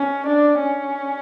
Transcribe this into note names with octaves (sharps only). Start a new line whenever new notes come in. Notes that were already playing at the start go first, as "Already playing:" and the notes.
Already playing: C#4
D4
C#4